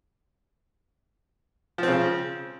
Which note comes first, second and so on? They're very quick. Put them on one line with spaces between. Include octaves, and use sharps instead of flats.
F3 C4 C#3